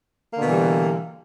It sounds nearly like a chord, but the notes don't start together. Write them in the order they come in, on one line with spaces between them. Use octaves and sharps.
A#3 D3 B2 E3 G3